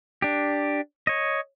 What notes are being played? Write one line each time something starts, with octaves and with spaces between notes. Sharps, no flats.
D4 G4
C#5 D#5